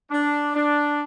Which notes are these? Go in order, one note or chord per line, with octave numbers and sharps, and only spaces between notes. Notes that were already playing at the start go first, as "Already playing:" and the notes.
D4
D4